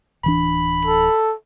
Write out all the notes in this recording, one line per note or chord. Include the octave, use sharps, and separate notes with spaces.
D1 E3 D4 B5
A4